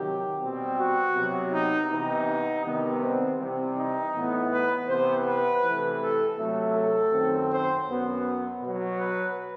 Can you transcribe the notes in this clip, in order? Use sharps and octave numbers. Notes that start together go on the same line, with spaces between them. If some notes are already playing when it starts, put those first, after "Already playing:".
Already playing: C3 D#3 F#3 G4
B2 G3 C4
F#4
C3 F#3 B3
D#4
C3 E3 B3 D#4
C3 D#3 G3 B3
C4
C3 E3 G3 C4
D#4
A2 E3 B3
B4
C3 E3 B3 C5
B4
C3 E3 A3
A4
C3 F#3 A3
A4
F#2 D#3 F#3 C4
C5
F#2 F#3 B3
B2 F#3 B3
B4